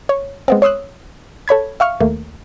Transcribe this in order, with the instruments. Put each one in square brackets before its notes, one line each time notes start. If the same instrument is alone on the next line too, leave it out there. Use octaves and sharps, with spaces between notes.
[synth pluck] C#5
G#3 B3 C4
C#5 C6 D#6 E6 F#6
A4 C#5 B5 G#6
E5 F5 C#6 F6
D#2 A3 A#3